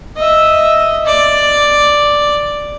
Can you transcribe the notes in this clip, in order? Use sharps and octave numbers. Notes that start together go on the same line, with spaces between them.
D#5 E5
D5